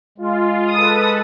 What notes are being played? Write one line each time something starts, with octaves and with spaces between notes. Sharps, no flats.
G#3 F4
A4 B4 A5 D#6